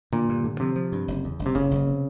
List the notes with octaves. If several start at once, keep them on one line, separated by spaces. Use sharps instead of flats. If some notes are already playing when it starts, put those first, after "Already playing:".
A#2 D3
G2
D3
C3 F3
F3
G2
F#1
E2
F#1
C3
F#1 C#3
F#1
C3